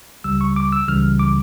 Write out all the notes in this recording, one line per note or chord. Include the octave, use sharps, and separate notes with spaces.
C#2 C#3 G3 E6
C#6
D6
E6
C#2 C#3 E3 G3 F6
D6